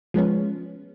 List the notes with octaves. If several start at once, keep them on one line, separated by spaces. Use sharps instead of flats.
F3 G#3 B3 C#4